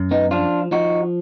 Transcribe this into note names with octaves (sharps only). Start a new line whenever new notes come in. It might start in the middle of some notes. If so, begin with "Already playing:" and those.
Already playing: F#2
B3 D#4
F3 D4 F4
F3 D#4 F#4